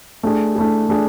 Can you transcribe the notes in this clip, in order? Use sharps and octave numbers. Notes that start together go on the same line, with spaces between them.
A3 D4 G#4
A3 D4 G#4
A3 D4 G#4